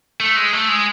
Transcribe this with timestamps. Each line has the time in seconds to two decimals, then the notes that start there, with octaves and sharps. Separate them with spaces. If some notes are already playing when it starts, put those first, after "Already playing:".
0.20 A3
0.36 G#3
0.53 A3
0.68 G#3